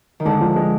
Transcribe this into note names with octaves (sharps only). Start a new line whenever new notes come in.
D#3
D3 G#3
F3
G#3